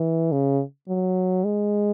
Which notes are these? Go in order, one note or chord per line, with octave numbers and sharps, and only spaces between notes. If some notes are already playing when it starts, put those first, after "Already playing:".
Already playing: E3
C#3
F#3
G#3